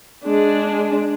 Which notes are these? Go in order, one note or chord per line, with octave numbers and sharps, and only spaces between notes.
G#3 D4